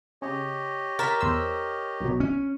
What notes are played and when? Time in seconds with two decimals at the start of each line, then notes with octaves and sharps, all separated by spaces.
0.22 C#3 G4 C#5 D#5
0.99 A#4 A6 B6 E7
1.21 E2 C5 E6
2.00 B1 B2
2.20 C#4